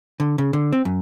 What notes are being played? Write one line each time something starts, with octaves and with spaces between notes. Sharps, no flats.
D3
C#3
D3
C4
F#2